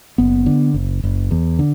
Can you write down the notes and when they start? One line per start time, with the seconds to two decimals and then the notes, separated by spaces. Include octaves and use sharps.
0.18 F#1 B3
0.46 D3
0.74 F#1
1.03 F#1
1.31 E2
1.59 D3